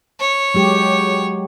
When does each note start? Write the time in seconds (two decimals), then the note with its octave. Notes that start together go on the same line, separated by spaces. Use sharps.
0.20 C#5
0.54 F#3 G#3 G4